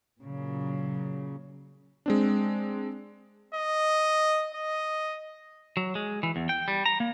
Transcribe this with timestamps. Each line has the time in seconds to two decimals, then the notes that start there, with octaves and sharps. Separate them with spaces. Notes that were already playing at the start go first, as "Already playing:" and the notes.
0.21 A#2 C#3 F#3
2.06 G#3 C4 D4
3.55 D#5
4.55 D#5
5.77 F#3
5.95 G#3
6.23 E3
6.36 E2
6.49 G5
6.68 G3
6.86 A#5
7.00 A#3